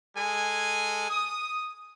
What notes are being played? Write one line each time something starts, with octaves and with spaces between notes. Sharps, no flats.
G#3 A4 G#5
D#6